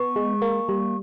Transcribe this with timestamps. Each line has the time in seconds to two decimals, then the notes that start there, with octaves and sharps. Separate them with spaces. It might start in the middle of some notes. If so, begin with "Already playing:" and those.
Already playing: B3 C#6
0.16 G#3
0.42 A#3
0.69 G3